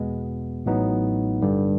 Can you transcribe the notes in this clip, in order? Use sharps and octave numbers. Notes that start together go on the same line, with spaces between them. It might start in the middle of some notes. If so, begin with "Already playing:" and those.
Already playing: E2 B2 G#3 B3
A1 A2 F#3 B3 D#4
G1 G2 D3 G3